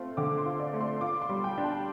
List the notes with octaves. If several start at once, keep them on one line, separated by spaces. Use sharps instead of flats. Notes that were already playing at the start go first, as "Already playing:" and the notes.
Already playing: A3 C4 F4 C6
D3 D6
C6
F4
D5
A3
C6
F4 D6
C6
G3
G5
D4
A5